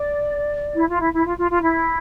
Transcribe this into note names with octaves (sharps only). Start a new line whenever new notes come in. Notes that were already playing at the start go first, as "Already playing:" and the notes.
Already playing: D5
E4
F4
E4
E4
F4
F4
F4
E4